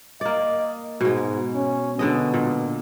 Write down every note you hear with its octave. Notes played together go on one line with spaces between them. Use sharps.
A#3 D5 D#5
G#2 B2 G#3
C#4
B2 D3 G#3 D#5
A#2